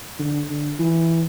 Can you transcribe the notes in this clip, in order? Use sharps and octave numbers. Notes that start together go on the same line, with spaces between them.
D3
D3
E3